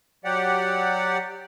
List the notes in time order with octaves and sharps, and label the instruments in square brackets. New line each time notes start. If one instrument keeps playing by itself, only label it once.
[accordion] F#3 G4 D5 F#5